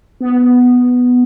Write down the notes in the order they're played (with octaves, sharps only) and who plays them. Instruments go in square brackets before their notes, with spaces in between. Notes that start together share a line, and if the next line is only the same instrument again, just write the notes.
[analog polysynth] B3